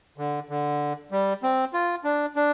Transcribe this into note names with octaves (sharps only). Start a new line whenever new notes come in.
D3
D3
G3
C4
F4
D4
D4